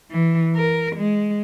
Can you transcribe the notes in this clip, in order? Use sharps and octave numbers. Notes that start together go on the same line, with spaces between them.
E3
A#4
G#3